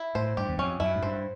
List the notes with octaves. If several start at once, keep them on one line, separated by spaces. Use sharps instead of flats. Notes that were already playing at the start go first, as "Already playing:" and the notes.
Already playing: E4
A2 C5
G2 G4
E2
F2 C#4
F#2 E4
G#2
G2 C5